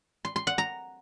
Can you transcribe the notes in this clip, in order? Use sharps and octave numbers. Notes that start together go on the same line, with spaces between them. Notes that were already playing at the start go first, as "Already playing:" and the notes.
C6
C6
F#5
A#5